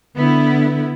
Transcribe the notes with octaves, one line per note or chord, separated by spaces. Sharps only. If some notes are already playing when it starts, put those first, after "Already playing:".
D3 B3 E4